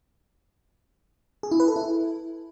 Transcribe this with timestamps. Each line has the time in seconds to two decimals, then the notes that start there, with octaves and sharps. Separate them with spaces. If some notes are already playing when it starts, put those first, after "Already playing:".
1.43 G#4
1.51 E4
1.60 B4
1.68 A4
1.76 E4